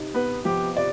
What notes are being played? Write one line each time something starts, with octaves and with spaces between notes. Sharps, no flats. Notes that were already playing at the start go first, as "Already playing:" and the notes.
Already playing: C3 D#4
B3 B4
F3 G4
C3 D5